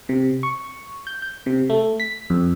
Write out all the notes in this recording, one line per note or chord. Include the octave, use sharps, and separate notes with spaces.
C3
C#6
G6
G6
C3
A3
B6
F2